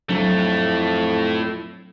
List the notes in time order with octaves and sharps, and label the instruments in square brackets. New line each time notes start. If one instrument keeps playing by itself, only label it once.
[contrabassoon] F2 [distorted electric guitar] A2 A3 [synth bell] F#3 D4 G7